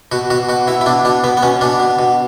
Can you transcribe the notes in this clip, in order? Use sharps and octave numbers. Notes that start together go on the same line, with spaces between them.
B2 F#4
B2 F#4
B2 F#4
B2 E4
E4
B2 D4
B2 D4
B2 B3
B3
B2 C#4
B2 D4
B2
B2